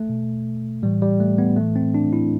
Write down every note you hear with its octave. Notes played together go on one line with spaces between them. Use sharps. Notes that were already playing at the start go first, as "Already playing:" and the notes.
Already playing: A3
B2
A2 E3 G3
G3
A3
B3
A2 E3 A3
C4
D4
E4